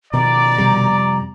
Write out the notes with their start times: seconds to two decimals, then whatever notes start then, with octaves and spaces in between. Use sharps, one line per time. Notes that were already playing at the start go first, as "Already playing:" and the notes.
0.13 B2 D#3 F3 D5 A#5
0.58 F2 C3 G3